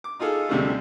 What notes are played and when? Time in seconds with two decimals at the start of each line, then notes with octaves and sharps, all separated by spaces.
0.04 D6
0.19 D#4 F4 G#4 A4
0.49 D2 C3 G3 A3